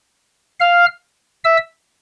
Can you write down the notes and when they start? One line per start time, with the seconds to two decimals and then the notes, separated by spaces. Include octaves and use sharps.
0.60 F5 F6
1.44 E5 E6